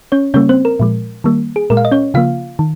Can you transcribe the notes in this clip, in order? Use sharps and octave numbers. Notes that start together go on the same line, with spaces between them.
C#4 C#5
C#3 G3 A#3 C#4 C#5
C4 C5
A#4
A#2 F3 G#3
D#3 G3 A#3
G#4
A#2 G#3 A#4
F5
D#5
C#4 C#5
C#3 F3 A#3 F4 F5
D#3